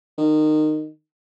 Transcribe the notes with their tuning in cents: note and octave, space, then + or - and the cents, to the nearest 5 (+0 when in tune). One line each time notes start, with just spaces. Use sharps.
D#3 -20